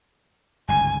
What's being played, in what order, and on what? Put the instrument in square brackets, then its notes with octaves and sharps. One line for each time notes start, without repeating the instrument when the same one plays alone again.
[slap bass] G1 C#2 G#2 [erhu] G#5